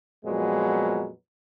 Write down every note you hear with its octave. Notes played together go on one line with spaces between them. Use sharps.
F2 A#2 F3 F#3 G#3 B3